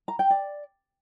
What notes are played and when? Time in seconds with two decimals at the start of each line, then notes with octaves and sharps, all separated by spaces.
0.08 A#5
0.19 G5
0.30 D5